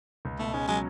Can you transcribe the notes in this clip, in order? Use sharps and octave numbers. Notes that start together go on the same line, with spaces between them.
C#2
B2 A3
G#3 C#4
F#3 G#3